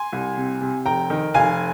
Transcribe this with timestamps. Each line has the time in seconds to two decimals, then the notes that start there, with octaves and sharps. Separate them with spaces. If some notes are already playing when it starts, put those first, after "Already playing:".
Already playing: G#5 C6
0.12 C2
0.37 C3
0.61 C3
0.86 F1 G5 A#5
1.10 D#3
1.34 F1 F5 G#5